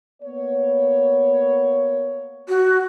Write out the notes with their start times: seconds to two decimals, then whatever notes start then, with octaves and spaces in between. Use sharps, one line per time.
0.22 A#3 B3 C#5
2.48 F#4